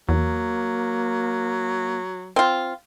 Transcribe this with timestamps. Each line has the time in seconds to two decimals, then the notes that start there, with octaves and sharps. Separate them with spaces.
0.09 E2 F#3 A#3
2.36 C4 F4